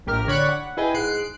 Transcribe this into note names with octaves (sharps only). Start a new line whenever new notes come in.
A#1 A2 G4 A#4 F6
D3 C#5 D5 B5 C#6 F#6
F#5
E4 G#4 B4 D#5 G5 G#5
G#2 G#3 F#6 C7 D7